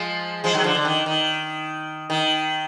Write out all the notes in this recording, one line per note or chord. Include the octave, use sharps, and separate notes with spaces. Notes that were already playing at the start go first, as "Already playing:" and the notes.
Already playing: F3 G#3
F3 G#3
D#3 F#3
D3 F3
D3
D#3
D#3
D#3